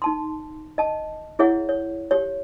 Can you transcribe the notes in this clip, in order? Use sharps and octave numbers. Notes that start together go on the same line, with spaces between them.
D#4 A5 C6
D#5 A5
E4 G#4 C#5 E5 F#5
C#5
G4 C#5